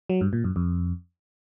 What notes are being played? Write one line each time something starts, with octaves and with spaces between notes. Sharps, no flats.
F#3
G2
A#2
F#2
F2